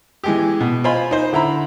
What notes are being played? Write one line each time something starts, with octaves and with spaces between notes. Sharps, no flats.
E3 G#3 G4
B2
F4 C5 D#5 G#5 B5
D#4 C5
D3 E4 A#5 B5